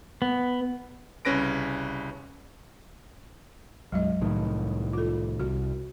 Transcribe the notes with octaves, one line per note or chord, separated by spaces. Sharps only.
B3
C2 C#3 C#4 B4 A#6 D7
B1 F#2 F#3 G#3 D#5
C2 A2 D#3
F4 A4
C2 F#4